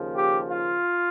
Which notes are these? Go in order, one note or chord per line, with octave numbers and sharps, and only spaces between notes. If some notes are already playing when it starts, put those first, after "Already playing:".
Already playing: D#2 C#3 F3 A#3
G4
F4